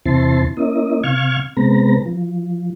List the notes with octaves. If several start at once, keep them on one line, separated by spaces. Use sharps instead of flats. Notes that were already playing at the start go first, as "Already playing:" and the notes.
E2 C3 C4 E4 A5 C6
A#3 C#4 E4 D#5
C3 F5 C#6 F6 G#6
C3 G#3 B3 C4 B4 A#5
F3